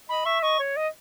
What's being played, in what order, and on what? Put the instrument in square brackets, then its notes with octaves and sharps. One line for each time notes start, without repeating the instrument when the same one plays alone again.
[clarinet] D#5 [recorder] B5
[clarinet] E5 [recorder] C#6
[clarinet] D#5 [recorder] C#6
[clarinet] C#5
D#5